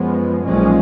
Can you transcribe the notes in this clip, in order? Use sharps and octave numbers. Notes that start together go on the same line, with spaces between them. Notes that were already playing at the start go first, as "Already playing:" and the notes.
Already playing: F#2 F3 G#3 B3
B1 A#2 F3 G#3 C#4